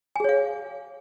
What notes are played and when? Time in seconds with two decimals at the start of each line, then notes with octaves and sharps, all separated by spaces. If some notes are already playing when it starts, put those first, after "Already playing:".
0.16 G#5
0.20 G#4
0.24 C#5
0.29 F5